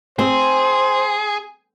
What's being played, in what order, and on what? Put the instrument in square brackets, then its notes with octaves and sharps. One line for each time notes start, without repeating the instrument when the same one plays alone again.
[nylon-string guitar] C4 [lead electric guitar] G#4 [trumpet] C5